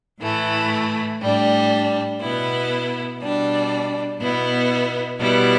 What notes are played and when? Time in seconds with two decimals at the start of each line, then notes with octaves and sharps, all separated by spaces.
0.20 A2 E3 A3 E4
1.21 A2 G3 D4
2.20 B2 B3 E4
3.19 B2 G3 D4
4.20 B2 B3 E4
5.19 B2 G3 B3 E4